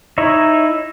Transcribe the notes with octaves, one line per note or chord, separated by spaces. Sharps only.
D#4 E4 C#5